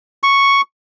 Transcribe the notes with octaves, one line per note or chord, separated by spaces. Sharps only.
C#6